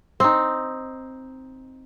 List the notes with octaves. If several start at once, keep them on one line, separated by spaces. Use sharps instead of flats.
C4 D#4